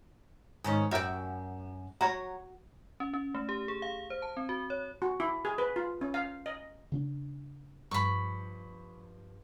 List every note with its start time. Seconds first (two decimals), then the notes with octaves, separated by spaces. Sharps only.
0.64 G#2 D#3 C#4
0.91 F#2 F#4 D5 E5 G5
2.01 F#3 F#4 C#5 A#5
3.00 C#4
3.14 C#4
3.35 A3
3.49 G4
3.68 G#4
3.82 F5
4.10 C5
4.22 A5
4.37 C4
4.49 F#4
4.70 C#5
5.02 F#4
5.20 E4
5.45 G#4
5.58 B4
5.76 F4
6.01 C#4
6.14 F5
6.46 D#5
6.92 C#3 C#4 D4
7.91 G2 F3 B5 C#6